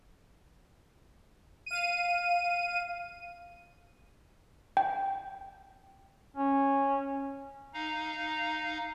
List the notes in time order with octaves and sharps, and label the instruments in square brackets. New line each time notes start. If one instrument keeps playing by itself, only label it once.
[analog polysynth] F5 D#7
[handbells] G5
[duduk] C#4
[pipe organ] D#4 F5 A#5